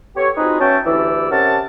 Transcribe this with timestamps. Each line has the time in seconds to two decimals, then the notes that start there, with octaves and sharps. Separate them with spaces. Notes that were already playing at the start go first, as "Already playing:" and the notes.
0.16 B3 G4 A4 C#5
0.37 C4 D#4 F4 F#4 G#4 B4
0.60 B3 C#4 F#4 E5 G5 A5
0.86 D2 E3 E4 G4 D5 E6
1.31 C3 C#4 A#4 F#5 A5